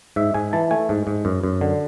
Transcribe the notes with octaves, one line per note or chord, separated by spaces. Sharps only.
G#2 E5
G#2 G#5
E3 A5
A3 G#5
G#2
G#2
F#2
F#2
D3